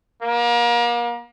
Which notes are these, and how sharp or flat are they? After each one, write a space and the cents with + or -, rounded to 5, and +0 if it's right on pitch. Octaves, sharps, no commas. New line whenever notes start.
A#3 +35